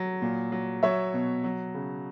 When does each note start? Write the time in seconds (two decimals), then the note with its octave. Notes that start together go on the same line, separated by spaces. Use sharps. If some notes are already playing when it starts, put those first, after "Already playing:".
Already playing: F#3
0.22 A#2
0.52 F#3
0.83 F#3 C#5 E5
1.14 B2
1.44 F#3
1.74 C#3